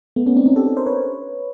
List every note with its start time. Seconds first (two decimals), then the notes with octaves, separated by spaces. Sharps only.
0.16 A3 B3
0.26 B3 C#4
0.36 C4 D4
0.46 C#4 D#4
0.56 G4 A4
0.77 A#4 C5
0.86 B4 C#5